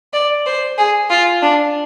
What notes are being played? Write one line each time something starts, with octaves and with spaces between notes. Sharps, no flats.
D5
C5
G#4
F4
D4